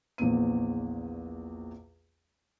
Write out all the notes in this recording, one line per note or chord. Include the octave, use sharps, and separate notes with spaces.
A#1 E2 A#2 B3 D#7